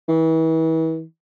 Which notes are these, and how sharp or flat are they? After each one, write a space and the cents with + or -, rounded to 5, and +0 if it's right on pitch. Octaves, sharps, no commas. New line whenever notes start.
E3 -35